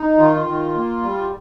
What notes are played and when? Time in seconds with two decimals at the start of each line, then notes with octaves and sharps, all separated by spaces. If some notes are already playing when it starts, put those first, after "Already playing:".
Already playing: D#4
0.18 D#3 F4
0.47 D#3
0.75 A#3
1.02 G3